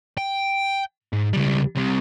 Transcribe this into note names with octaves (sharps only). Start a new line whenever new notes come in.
G5
G#2
C#2 G3
C2 C3